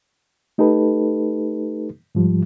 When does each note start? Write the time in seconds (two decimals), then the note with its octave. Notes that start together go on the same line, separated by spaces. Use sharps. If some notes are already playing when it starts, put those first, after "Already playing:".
0.58 A3 D#4 G4 A4 B4
2.15 G#2 F3 G3